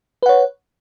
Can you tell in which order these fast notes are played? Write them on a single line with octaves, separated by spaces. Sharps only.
B4 F#5 C#5